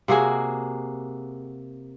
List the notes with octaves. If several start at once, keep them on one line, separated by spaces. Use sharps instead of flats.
C3 A#3 F#4 G#4